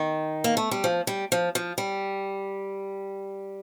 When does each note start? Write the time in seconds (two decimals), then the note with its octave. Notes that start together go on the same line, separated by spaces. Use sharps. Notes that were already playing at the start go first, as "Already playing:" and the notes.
Already playing: D#3
0.44 A#3
0.57 A3
0.71 G3
0.84 F3
1.07 G3
1.32 F3
1.55 F3
1.78 G3